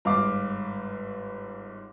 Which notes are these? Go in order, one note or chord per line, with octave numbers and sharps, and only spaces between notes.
G1 G#2 F5 D6